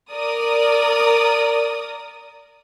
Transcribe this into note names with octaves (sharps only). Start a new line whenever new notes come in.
A#4 D5 D#6